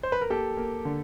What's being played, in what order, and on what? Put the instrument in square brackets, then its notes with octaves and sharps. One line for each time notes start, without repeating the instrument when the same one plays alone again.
[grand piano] C5
B4
A#4
A#3 G4 A4
A#3
D3